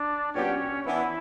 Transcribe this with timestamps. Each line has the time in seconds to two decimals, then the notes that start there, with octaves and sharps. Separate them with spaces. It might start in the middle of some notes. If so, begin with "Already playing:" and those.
Already playing: D4 D5
0.34 A#2 F#3 B3 C#4 D4 G4 C#5
0.85 E3 B3 D4 E4